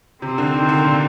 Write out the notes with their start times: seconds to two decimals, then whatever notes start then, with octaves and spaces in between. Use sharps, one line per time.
0.22 C3 C4
0.38 D3
0.54 D#3
0.69 D3
0.85 A#2